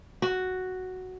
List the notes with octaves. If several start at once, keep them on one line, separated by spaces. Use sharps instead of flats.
F#4